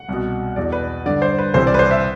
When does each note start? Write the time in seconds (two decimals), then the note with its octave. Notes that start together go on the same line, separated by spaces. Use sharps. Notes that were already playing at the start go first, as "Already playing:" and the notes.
Already playing: F#5
0.09 C2 B2
0.56 E2 B2 D5
0.72 B4
1.06 G2 D3 D5
1.22 C5
1.38 B4
1.54 C2 C3 E3 C5
1.67 D5
1.74 B4
1.79 C5
1.91 E5